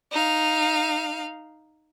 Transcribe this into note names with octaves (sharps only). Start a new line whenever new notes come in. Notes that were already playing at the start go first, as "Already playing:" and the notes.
D#4 F5